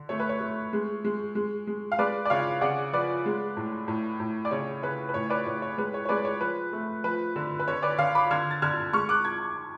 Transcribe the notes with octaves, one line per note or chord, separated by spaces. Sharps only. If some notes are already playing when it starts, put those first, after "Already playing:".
Already playing: D3
A3 C#5
B4
C#5
A3
G#3
G#3
G#3
G#3
F5
G#3 B4 D5
D5
C#3 C#5 F5
C#3 D5 F#5
F3 B4 D5
G#3
A2
A2
A2
D5
C#3 C#5
C#3 B4
B4
A2 C#5
B4 D5
A2 C#5
C#5
G#3 B4
C#5
C#5
G#3 B4 D5
C#5
F3 B4
A3
F3 B4
D3
B4
D3 C#5
B4 D5
D3 C#5 F5
B5 D6
D3 F6 G#6
A6
D3 F6 G#6
G#3 C#6 F6
D6 F#6
G#6